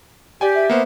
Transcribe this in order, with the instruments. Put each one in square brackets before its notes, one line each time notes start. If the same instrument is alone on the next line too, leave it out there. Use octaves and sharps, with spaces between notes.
[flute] G4 [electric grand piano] D5 G5 G#5
[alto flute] E5
[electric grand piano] A#3 B3 C5